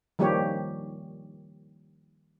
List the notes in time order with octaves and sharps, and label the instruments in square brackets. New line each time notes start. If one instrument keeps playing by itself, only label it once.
[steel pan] D#3 F3 G3 A#3 G4 C#5